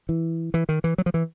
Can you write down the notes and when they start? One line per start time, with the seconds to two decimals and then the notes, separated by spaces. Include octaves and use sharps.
0.09 E3
0.54 E3
0.69 D#3
0.84 E3
0.98 F#3
1.06 F3
1.14 E3